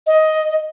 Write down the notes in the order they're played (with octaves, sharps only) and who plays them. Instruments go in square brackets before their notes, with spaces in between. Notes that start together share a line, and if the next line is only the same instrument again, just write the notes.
[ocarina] D#5